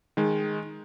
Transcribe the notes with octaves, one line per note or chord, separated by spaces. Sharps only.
D#3 G#3